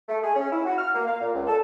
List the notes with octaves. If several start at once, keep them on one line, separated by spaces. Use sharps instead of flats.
A3
G#4
C#4
E4
F#4
F6
A#3
F5
A#2
C#2
A4